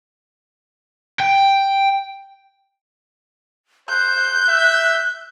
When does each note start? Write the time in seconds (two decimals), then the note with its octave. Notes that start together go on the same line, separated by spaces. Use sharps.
1.20 G5
3.89 C5 F#6 G6
4.49 E5